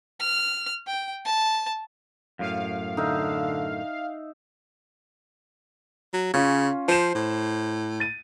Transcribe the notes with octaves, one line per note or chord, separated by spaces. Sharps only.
F6
G5
A5
F#2 A2 F5
D3 D#4 E5
F#3
C#3 C#4 F4
F3 C5 E7
A2
A6 D#7